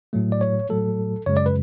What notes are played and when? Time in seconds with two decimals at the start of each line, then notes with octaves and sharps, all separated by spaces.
0.13 A2 F#3 A3
0.32 D5
0.41 C#5
0.69 A2 F#3 A3 A4
1.26 F#2 C#3 G#3 C#5
1.37 D5
1.46 B4